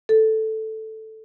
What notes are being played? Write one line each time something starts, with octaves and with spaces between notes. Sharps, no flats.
A4